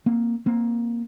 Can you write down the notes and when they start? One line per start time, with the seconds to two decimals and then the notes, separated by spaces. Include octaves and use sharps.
0.06 A#3 C4
0.46 A#3 C4